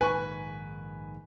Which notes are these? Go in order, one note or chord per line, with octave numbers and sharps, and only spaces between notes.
A#1 G#2 D#3 B4 G#5 C#6